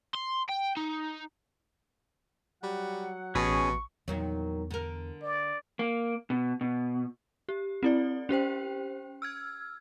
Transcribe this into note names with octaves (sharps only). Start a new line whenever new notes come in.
C6
G5
D#4
F#3 G3 F#4 F#5
A1 B2 C#4 G#4 C#6
E2 A#2 D#3 F#3
D3 A#4
D5
A#3
B2
B2
G4
C4 E4 D5
C#4 G4 C5 G5
E6 F6 G#6